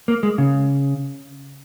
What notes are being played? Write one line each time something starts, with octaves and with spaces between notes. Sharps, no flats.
A#3
G#3
C#3